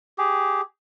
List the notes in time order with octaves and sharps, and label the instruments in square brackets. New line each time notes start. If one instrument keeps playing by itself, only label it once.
[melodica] G4 G#4